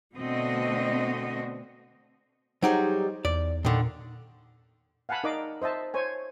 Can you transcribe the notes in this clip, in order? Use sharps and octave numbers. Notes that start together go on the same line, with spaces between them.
B2 D3 A3 C4 F#4 D#5
F#3 G3 D#4 G#4 C5
E2 D5
A#2 D3 D#3
F5 F#5 G#5 A5 B5
D#4 A#4 D5 D#5 F5 D6
C5 D#5 E5 A5
C5 C#5 G#5